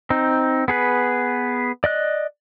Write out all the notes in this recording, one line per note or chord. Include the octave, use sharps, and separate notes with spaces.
C4 D#4
B3 G#4 B4
D5 D#5 F#6